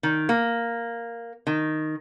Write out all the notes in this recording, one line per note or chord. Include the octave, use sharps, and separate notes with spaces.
D#3
A#3
D#3